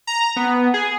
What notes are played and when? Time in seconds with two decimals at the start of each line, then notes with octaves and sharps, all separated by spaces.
0.07 A#5
0.36 B3
0.74 G#4